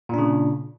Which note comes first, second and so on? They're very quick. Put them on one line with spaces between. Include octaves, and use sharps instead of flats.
A#2 D4 C#3